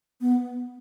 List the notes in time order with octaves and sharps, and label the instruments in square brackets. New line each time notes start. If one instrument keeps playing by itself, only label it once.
[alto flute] B3